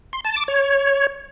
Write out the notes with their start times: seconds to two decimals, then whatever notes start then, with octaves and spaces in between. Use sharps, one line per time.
0.13 C6
0.25 A5
0.36 D6
0.48 C#5